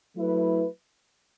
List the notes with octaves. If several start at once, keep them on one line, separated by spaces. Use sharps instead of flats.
F#3 A3 E4 B4